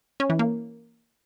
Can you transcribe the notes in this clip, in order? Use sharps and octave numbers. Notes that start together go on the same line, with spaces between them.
C#4
E3
A#3